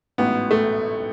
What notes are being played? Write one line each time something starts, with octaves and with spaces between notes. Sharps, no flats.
A1 G#2 F#3 B3
A3